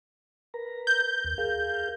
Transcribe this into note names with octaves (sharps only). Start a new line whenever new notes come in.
A#4 B4 A#5
G6
D#2
G#4 A#4 F5